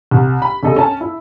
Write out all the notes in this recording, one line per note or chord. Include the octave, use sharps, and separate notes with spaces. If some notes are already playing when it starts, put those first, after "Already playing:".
C2
B5
C#2 C3 A4 D#5
C#4 A5
E4